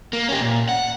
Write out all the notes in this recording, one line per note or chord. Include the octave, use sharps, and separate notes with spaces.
A#3
C#4 G4
A#2
F#5